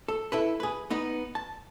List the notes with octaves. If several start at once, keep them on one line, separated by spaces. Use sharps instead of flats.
A4
E4 A4 B4
G#4 B4
B3 D#4 B4
A5